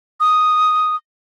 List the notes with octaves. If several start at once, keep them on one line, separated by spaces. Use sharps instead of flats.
D#6